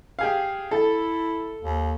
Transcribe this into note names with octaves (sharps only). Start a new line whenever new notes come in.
G4 G#4 F5
E4 A4
D#2